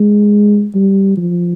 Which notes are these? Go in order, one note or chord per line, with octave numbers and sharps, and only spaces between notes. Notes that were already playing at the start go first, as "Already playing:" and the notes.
Already playing: G#3
G3
F3